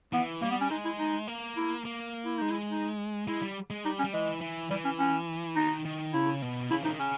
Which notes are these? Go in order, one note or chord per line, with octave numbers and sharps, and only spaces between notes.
E3 B3
G3 A#3
B3
C#4
G#3 D#4
E4
D#4
A#3
E4
A#3
E4
G#3 D#4
E4
D#4
G#3 E4
G3
G#3
G3 D#4
C#4
G3
E3 G#3
E3
E3 G3
C#4
C#4
D#3 D#4
D#3
C#3 E4
B2
C#3 E4
E3 D#4
D#3
C#3 C#4